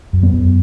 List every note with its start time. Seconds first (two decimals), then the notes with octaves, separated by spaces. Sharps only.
0.13 F#2
0.23 B3
0.33 F#2